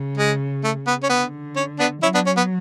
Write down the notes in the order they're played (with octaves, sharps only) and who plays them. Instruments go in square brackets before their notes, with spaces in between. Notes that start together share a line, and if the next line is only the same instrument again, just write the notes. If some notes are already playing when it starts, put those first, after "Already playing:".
Already playing: [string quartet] C#3
[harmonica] G#3
A3
B3
C#4
[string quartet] D3 [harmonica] B3
[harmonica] C#4
B3 D4
[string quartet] F#3 [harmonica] C#4 E4
[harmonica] B3 D4
C#4
B3